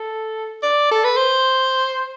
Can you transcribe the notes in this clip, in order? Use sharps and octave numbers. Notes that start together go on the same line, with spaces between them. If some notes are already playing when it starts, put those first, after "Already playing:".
Already playing: A4
D5
A4
B4
C5